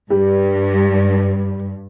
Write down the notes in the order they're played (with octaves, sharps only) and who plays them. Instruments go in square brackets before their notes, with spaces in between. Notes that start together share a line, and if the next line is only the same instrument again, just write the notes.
[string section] G2 [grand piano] G3